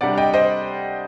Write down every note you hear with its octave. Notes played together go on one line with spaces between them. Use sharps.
C3 G3 D4 D5 F#5
D#5 G5
C5 D#5